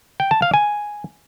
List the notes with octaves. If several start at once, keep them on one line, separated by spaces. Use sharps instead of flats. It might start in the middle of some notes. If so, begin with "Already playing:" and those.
G5
A5
F5
G#5